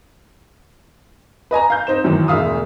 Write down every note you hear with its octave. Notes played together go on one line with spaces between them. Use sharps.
B4 D#5 G#5 A#5
F5 G6
C4 D#4 C5 E7
F#2 A2 D#3 E3
E1 D2 E5 F5 D#6